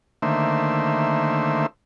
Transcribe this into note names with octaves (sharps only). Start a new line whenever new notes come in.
D3 D#3 A3 A#3 C5 E5